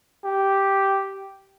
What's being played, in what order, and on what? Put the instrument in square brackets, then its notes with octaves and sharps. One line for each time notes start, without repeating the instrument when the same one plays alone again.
[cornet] G4